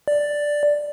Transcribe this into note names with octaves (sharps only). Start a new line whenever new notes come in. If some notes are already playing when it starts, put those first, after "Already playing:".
D5